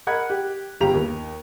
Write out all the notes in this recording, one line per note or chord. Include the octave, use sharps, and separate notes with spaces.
A#4 D#5 F#5 B5 F#6 G#6
G4
G1 C#2 G4 F5 A#5 F7
D#2